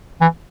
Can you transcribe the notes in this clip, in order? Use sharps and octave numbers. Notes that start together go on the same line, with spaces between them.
E3